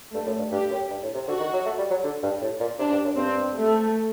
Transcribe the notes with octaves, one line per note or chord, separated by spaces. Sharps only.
G2 A3
F#2
G2
G2 G4
F#2
G2
A2
C3
D3 F#4
D#3
F#3
A3
G3
F#3
D3
G2
A2
A#2
C3 D4
G2
F#2
G2 C4
A3